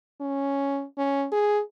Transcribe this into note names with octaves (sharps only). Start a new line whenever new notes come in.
C#4
C#4
G#4